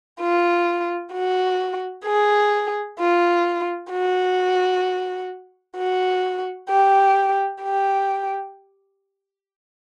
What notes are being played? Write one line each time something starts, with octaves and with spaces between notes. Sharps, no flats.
F4
F#4
G#4
F4
F#4
F#4
G4
G4